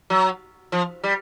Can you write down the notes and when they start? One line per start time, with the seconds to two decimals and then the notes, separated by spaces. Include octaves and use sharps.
0.10 F#3
0.72 F3
1.04 G3